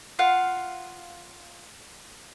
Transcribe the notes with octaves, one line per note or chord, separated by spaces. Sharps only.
F4 F5 F#5